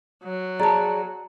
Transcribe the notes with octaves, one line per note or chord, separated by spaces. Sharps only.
F#3
G#4 D5 A5 A#5